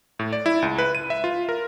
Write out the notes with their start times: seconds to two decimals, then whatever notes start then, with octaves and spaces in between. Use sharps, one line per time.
0.19 A2
0.33 D5
0.46 E4
0.62 C#2
0.78 B4
0.95 D#7
1.10 E5
1.24 F4
1.49 A#4